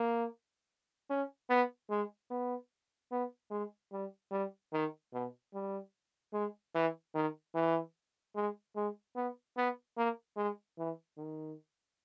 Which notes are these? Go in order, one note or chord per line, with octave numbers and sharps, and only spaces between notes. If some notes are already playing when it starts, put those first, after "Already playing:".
Already playing: A#3
C#4
B3
G#3
B3
B3
G#3
G3
G3
D#3
B2
G3
G#3
E3
D#3
E3
G#3
G#3
B3
B3
A#3
G#3
E3
D#3